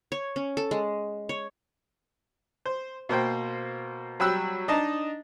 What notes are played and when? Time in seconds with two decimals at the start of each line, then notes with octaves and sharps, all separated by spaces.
0.12 C#5
0.36 C#4
0.57 A4
0.71 G#3
1.29 C#5
2.66 C5
3.09 B2 A#3 C5 G5
4.20 F#3 G3 G5 B5 E6 F#6
4.68 D4 D#4 D#5 A5 A#5